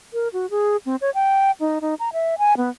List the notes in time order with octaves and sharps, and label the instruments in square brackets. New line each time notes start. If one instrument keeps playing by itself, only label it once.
[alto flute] A#4
F#4
G#4
C4
C#5
G5
D#4
D#4
A#5
E5
G#5
B3